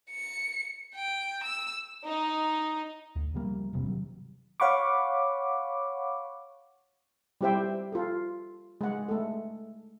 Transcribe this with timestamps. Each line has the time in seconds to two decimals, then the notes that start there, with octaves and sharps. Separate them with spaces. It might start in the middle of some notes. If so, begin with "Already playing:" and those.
0.10 C#7
0.95 G5
1.44 E6
2.04 D#4
3.16 D2
3.34 C#3 F3 G3 A#3
3.73 E1 G2 C3
3.86 C3 D#3 F#3
4.60 C#5 F5 F#5 B5 C#6 D6
7.41 G3 E4 G4 C5 E5 G5
7.92 F4 A4
8.81 G#3 F#5
9.09 A3 A4